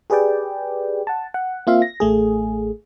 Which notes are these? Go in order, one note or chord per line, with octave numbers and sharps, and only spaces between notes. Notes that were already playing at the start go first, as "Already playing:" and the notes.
G4 G#4 B4 D5 G5
F#5 A5
F#5
A#3 C4 F4 E5 F5
A#6
A1 A3 G#4